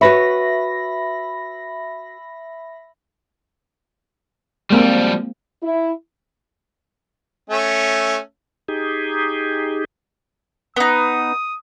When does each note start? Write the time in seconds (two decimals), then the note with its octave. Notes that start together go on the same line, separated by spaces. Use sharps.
0.01 F#4 B4 C#5 E5 B5 A#6
4.70 F3 G3 G#3 A#3 C4
5.63 E4
7.50 A3 C#4 E5
8.68 D#4 G4 G#4
10.76 B3 D#4 D#6